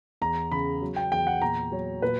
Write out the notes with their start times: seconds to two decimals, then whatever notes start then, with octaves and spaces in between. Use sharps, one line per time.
0.21 E2 A#5
0.52 C#3 B5
0.82 F#3
0.96 G5
1.12 E2 G5
1.27 F#5
1.42 A#2 A#5
1.72 F#3 C#5
2.02 A#2 B4